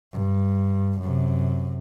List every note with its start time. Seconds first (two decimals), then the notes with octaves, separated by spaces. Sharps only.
0.12 G2
1.01 F#2 C3